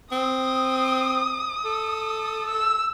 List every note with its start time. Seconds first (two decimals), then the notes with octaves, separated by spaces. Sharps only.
0.12 C4 D#6
1.65 A4
2.48 E6